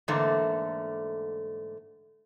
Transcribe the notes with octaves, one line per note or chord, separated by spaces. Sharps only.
G#2 D3 E3 A3 A#3